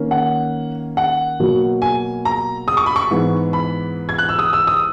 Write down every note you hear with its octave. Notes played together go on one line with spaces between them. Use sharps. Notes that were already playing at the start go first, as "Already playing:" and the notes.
Already playing: D#3 A#3 C#4
F#5
F#5
B2 F#3 A#3
G#5
A#5
D#6
C#6
B5
C#6
G#2 E3 B3
B5
G#6
F#6
E6
D#6
E6
D#6